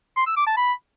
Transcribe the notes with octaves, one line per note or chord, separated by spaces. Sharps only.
C6
E6
D6
A5
B5